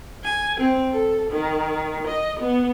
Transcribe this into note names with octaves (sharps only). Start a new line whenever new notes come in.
G#5
C4
A4
D#3
D#5
B3